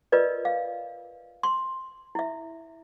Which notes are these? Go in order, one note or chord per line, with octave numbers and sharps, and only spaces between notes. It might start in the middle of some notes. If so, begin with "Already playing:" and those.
F4 A#4 B4 D5 D#5
F5
C6
E4 E5